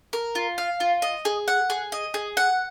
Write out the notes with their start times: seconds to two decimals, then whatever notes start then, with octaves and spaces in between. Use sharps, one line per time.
0.13 A#4
0.35 F4
0.58 F5
0.80 F4
1.02 D#5
1.25 G#4
1.48 F#5
1.70 G#4
1.92 D#5
2.14 G#4
2.37 F#5